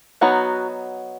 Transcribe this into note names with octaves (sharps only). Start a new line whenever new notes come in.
F#3 B3 D#4 F#4